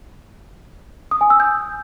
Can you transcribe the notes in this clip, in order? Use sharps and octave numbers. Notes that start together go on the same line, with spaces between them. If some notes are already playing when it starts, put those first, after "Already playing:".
D#6
G#5
E6
G6